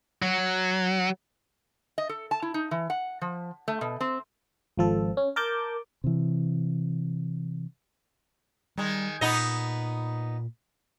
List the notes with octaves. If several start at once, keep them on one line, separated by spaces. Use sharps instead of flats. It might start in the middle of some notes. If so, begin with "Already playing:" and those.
F#3
D#5
A4
A5
E4
D#4
E3
F#5
F3
A3
B2
C4
G#1 F3 A4
C#4
A#4 A5 D6 G6
C3 E3
D#3 G3 G#3
A#2 B3 D#4 D#5